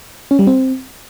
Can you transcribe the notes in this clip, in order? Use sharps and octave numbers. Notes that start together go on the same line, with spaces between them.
C#4
G3
C4